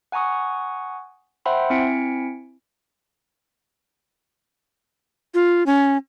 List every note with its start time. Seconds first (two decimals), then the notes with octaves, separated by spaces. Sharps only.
0.12 F#5 G#5 A#5 C#6 D#6
1.46 C5 E5 F#5 G5 B5 C6
1.70 C4 E4 G#5 B6 C#7 D7
5.34 F4
5.66 C#4